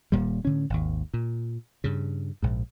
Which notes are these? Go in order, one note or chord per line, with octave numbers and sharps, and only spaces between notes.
D#1 A#2 G3
A2 D3 C#4
G#1 D#2
A#2
G2 C#3
A#1 G#2